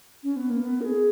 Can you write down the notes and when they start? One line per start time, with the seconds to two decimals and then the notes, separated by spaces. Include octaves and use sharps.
0.23 C#4
0.36 B3
0.49 A#3
0.62 B3
0.81 A#4
0.84 G#4